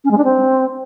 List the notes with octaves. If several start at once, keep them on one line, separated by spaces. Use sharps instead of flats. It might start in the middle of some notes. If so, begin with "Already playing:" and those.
C#4
G#3
D4
C4